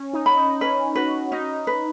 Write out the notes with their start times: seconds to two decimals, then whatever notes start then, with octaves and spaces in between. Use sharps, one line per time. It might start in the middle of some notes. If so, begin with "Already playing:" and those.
Already playing: C#4
0.13 D#4
0.26 B5
0.37 D#4
0.60 C#4 B4
0.96 F#4 B4
1.32 C#4 D#4
1.67 B4